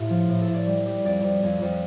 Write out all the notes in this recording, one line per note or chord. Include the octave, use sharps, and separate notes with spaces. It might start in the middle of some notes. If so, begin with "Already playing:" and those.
Already playing: A2 F4 G4
F3
A2
A4
A2
D5
G3
G3
F2 D5
F2
F2
F2